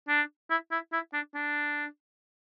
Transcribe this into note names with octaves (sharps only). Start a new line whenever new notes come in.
D4
E4
E4
E4
D4
D4